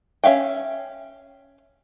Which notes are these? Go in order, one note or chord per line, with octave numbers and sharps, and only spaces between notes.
C#4 E5 F5 G5